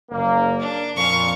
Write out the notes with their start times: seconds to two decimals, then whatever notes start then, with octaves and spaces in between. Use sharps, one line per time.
0.11 F#1 A#3
0.60 D4
0.96 F2 A#2 F5 C#6